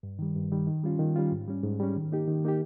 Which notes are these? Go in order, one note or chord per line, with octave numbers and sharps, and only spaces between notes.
G2
D#3 G3
G2
D#3 G3
D#3
G3 C#4 F4
D#3
G3 C#4 F4
G#2
G3 C#4
G#2
G3 C#4
D#3
A#3 D#4 G4
D#3
A#3 D#4 G4